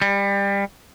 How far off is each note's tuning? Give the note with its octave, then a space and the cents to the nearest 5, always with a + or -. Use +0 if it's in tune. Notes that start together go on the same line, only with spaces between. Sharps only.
G3 +25